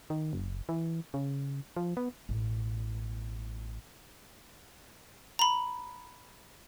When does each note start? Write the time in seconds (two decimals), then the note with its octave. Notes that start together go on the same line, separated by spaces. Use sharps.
0.10 D#3
0.33 F#1
0.69 E3
1.14 C#3
1.76 F3
1.97 B3
2.29 A1 B2
5.39 A#5 B5